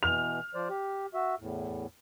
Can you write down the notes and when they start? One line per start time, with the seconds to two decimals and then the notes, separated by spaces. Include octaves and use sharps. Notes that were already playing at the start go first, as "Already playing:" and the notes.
0.03 B2 E3 F6 F7
0.54 F3 C5 D5
0.70 G4
1.14 F#4 E5
1.40 E2 A2